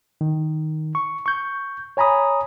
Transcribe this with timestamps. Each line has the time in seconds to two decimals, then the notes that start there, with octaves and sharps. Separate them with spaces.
0.21 D#3
0.95 C#6
1.26 C#6 G6
1.97 C#5 G#5 A#5 B5 D#6